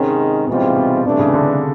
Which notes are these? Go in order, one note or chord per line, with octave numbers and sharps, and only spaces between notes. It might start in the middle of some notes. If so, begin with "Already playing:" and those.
Already playing: G#2 C3 D#3 G#3 C#4
G#2 B2 E3 G3 C4 F4
C3
B2
G2 C3 E3 A3 D4
C#3
D3